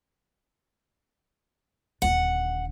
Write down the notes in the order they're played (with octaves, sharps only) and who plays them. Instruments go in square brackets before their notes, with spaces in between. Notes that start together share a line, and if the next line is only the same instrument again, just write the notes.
[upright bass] D#1 D3 [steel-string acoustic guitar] F#5